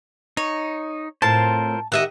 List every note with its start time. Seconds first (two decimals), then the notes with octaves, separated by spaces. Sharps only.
0.37 D#4 C#5
1.22 A2 C4 F4 A#4 C5 A5
1.92 D#3 G4 D#5 E5 F#5